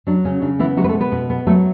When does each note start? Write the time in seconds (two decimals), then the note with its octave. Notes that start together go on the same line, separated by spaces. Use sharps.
0.07 F#3 D4
0.25 C#3 C#4
0.41 C#3 D4
0.59 E3 B3 E4
0.77 F#3 G#3 F#4
0.84 B4
0.89 A3 A4
0.94 B2
1.00 B3 B4
1.12 B2
1.30 B3
1.47 F#3 A3 A4